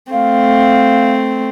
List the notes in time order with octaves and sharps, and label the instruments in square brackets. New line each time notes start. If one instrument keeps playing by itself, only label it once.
[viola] A3 C4 [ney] F5